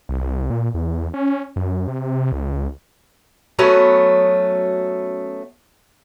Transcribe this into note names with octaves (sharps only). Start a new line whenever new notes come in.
C2
A#2
E2
C#4
F#2
C3
C#2
F#3 A3 B3 C#4